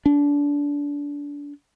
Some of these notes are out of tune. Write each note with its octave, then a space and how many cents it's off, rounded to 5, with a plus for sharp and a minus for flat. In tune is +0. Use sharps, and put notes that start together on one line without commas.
D4 -25